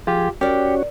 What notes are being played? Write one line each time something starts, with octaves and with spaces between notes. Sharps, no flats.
F3 F4 G4 G#4
C#4 F#4 G4 A#4 C#5 D5